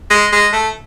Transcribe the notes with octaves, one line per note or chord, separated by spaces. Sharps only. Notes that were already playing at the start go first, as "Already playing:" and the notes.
G#3
G#3
A3